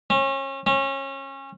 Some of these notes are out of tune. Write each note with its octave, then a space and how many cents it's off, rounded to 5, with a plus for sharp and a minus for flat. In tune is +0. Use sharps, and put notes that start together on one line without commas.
C#4 -30
C#4 -25